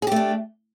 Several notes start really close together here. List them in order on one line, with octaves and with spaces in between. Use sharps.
G#4 G4 A3 D4